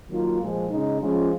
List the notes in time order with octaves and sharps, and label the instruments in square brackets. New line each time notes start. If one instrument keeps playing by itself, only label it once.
[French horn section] D#3 F#3 A#3 F4
A#2 F3 G#3
C#3 G#3 D#4
F3 G#3 C#4 F4